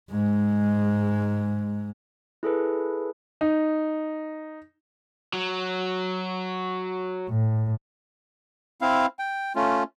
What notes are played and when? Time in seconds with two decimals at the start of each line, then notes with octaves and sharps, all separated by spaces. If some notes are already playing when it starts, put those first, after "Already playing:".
0.11 G#2 G#3
2.43 E4 G#4 A4 B4
3.41 D#4
5.33 F#3
7.29 A2
8.81 C4 E4 F5
9.19 G5
9.55 A3 C#4 F4